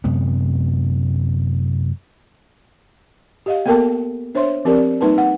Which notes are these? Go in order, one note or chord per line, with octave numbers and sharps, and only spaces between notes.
F#2 C3 G#3 B3
G4 D#5 F5
A#3 B3 A4 A#4 G5 A5
D4 C5 C#5 E5 C6
F3 C4 G4 A#4 D5
G3 A#3 D#4 B4 A5
F#5